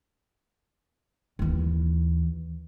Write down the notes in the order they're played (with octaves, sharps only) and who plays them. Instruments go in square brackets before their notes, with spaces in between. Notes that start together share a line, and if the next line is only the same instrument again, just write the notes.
[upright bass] D#2 E3